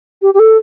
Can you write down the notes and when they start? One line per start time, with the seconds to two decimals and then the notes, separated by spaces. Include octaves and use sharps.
0.22 G4
0.34 G4
0.39 A4